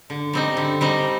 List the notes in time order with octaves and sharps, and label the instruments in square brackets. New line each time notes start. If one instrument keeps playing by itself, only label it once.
[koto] D3
G3 C4 D#4
D3
G3 C4 D#4